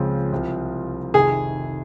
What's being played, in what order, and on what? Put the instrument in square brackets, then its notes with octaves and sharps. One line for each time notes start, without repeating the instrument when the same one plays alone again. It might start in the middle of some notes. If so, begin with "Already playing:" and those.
Already playing: [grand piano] C#2 C#3 F3 G#3 C4
C2 C3 F3 C4 F4
[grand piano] F1 F2 C3 D#3 [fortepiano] G#4